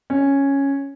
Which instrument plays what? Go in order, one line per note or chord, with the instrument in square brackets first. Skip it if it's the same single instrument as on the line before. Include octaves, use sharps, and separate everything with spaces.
[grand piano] C#4